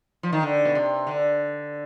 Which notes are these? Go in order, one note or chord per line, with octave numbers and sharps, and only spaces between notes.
F3
D#3
D3
B2
C3
D3